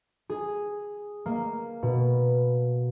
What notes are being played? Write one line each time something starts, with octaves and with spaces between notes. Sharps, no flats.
G#4
A#3
B2